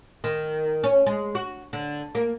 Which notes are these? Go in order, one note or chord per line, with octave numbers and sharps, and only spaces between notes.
D#3
C#4
G#3
F#4
D3
A#3